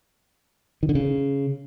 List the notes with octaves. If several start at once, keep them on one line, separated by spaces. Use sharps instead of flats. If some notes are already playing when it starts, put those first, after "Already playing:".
D#3
D3
C#3